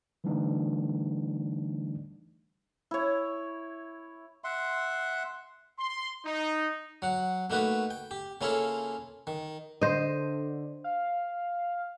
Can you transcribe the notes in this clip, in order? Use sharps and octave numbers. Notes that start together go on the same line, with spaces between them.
D3 E3 G3 A3 D4 D#4
E4 C#5
E5 F#5 C6
C6
D#4
F#3 F#5
A3 A#3 D#4 F#4 B4
G5
G4
C#3 A#3 C#4 E4 F4 A4
D#3
D3 C5 D#5
F5